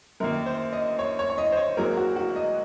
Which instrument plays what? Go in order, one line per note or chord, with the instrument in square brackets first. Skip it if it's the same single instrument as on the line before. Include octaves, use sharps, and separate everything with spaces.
[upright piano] F#2 D#3 A#3 A#4
C5
D#5
C#5
C#5
C#5
D#5
C5
C#5
G#1 G#2 F#3 A#3 A#4
F#4
F#4
D#5